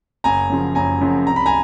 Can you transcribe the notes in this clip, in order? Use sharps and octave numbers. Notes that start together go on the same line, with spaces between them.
F#1 G#5 A#5
F#2 C#3 F3
F#1 G#5 A#5
F#2 C#3 F3
C2 A#5
B5
G#5 A#5